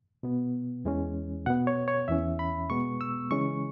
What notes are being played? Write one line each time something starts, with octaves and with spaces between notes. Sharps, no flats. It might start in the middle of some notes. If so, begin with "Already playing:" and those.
B2 B3
E2 E3 G#3 C#4
B2 B3 F#5
C#5
C#5
E2 E3 C#4 E5
B5
B2 G#3 B3 C#6
E6
C#3 E3 G#3 C#4 C#6